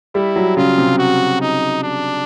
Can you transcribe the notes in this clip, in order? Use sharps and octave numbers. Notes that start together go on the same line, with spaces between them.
G3 E4
F#3
C#3 F4
C3
F#4
D#4
D4